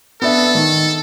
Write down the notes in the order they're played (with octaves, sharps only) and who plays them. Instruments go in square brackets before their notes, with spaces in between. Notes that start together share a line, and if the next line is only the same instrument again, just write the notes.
[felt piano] B3 D4 E5 [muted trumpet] A4
[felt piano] D#3